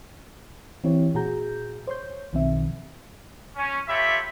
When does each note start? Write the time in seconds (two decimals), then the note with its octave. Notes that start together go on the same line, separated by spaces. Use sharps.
0.84 E3 C4 E4 G4 C#5
1.15 A#2 F#4 G#4 A#5 G6
1.87 C5 C#5 C6 G6
2.33 B1 D#3 F3 C4 E5
3.57 C#4
3.89 F4 G4 A4 C#5 E5 B5